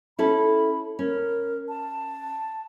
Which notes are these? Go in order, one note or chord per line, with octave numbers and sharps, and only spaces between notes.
C#4 E4 A4 B5
C#4 A#4
A5